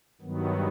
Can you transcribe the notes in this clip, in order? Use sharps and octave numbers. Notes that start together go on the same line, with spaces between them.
G2 D#3 F#3 B3